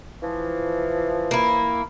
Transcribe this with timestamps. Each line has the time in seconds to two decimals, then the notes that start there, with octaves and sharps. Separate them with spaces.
0.22 E3 F3
1.31 A#3 E4